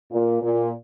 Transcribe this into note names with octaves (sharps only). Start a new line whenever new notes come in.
A#2
A#2